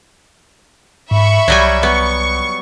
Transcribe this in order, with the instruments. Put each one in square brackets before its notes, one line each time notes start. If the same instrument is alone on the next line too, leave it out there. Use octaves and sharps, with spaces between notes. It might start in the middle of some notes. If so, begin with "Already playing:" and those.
[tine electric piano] G#2 [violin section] E5 B5 C#6
[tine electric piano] C2 [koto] F#3 G3 G#5
[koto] B3 [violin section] C#6